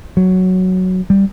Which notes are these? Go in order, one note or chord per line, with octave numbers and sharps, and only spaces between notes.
F#3
G3